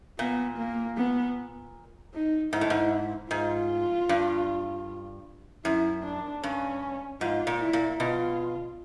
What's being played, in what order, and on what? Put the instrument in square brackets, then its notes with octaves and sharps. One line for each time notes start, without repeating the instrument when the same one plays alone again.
[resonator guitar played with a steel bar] A#2 [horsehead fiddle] B3
[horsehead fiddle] A#3
B3
D#4
[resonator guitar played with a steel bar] G#2 [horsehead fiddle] E4
[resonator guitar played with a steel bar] A2
G#2
[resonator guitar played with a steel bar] G#2 [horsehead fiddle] F4
[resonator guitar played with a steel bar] G2
[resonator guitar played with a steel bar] F#2 [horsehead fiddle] E4
[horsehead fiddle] D4
[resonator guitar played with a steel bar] G2 [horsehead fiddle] C#4
[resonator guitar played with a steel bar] G#2 [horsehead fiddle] F4
[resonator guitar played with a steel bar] A#2
[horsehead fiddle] E4
[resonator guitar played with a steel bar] A#2
[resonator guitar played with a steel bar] B2 [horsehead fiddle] F4